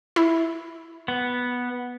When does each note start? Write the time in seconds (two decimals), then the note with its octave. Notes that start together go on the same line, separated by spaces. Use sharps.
0.16 E4
1.08 B3